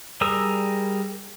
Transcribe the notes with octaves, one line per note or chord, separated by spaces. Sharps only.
G3 G#4 A#4 D#6 E6